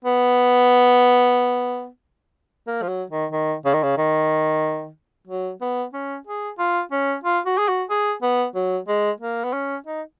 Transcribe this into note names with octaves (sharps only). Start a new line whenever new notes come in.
B3
A#3
F3
F#3
D#3
D#3
C#3
D#3
C#3
D#3
F#3
B3
C#4
G#4
F4
C#4
F4
F#4
G#4
F#4
G#4
B3
F#3
G#3
A#3
B3
C#4
D#4